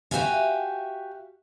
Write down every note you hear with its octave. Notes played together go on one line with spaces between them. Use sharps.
F#4 G4 B4 E5 F5 G#5